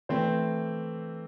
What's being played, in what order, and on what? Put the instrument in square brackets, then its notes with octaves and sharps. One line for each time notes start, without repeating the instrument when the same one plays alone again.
[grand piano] E3 A3 C4 C5